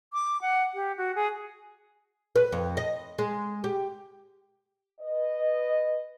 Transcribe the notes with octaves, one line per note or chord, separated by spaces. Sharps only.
D6
F#5
G4
F#4
G#4
B4
F2
D#5
G#3
G4
B4 D#5